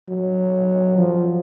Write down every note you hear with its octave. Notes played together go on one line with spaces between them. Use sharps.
F#3
F3